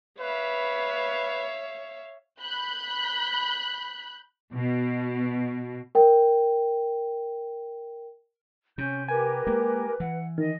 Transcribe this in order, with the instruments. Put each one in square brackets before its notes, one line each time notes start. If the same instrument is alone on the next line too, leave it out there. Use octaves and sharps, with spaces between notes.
[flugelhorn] B4 [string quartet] C#5 E5 F5
[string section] B5 F#6 G6
B2
[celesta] A#4 G5
[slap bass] C3 [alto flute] C#4 [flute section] G6
[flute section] G4 A#4 [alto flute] B4 [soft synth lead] G#5
[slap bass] G#3 A#3
[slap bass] E3 [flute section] F#5
[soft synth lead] D#3 [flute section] D#5